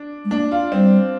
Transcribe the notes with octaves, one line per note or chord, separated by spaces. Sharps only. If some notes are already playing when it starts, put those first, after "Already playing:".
Already playing: D4
G#3
A#3 D4
F4
G3 C4